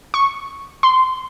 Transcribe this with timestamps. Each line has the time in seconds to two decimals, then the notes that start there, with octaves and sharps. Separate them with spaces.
0.14 C#6
0.83 C6